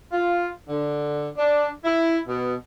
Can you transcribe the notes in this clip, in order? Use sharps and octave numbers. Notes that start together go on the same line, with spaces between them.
F4
D3
D4
E4
B2